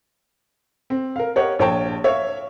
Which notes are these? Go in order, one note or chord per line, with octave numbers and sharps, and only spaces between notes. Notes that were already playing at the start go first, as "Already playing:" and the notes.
C4
A#4 F5
G4 A#4 C#5 D#5 F#5
A#1 C#5 G5 A5
C#5 E5 F5